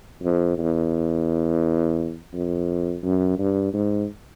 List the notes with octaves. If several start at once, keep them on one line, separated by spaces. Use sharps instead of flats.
F2
E2
F2
F#2
G2
G#2